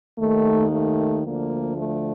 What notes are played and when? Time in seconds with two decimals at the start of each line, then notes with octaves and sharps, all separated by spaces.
0.19 D#2 D#3 A3
0.71 A3
1.24 D2 D3 F3 A#3
1.78 A3